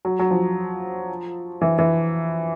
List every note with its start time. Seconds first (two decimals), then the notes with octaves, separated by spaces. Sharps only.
0.05 F#3
0.19 F#3
0.31 F3
1.61 E3
1.78 E3